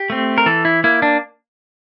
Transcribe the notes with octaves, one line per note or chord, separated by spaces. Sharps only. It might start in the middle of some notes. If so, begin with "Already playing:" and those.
Already playing: G4
A3 C4
A#4
E3 A4
E4
A#3 E4
D4